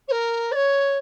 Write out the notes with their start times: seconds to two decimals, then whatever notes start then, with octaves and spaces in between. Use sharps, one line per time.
0.08 C#5
0.11 A#4
0.51 D5
0.55 C#5